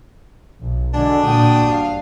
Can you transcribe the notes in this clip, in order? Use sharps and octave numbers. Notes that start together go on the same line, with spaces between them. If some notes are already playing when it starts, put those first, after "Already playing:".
B1
D3 G#3 D4 F#4 D5
A#2 G5 D#6
G1 F5